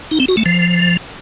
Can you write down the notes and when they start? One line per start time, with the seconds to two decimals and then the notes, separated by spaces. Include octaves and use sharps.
0.11 D#4
0.20 C4
0.28 F#4
0.37 A3
0.46 F3